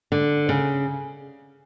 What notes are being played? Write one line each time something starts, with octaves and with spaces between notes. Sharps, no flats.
D3
C#3